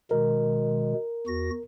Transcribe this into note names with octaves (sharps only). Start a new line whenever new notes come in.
B2 D#3 G#3 A#4
E2 F#4 A#6